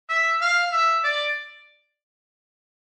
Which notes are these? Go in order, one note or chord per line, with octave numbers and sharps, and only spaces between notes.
E5
F5
E5
D5